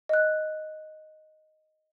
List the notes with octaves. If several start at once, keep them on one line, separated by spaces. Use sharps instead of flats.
D#5 F#6